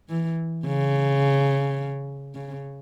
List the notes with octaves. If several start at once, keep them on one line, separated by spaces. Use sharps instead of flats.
E3
C#3
C#3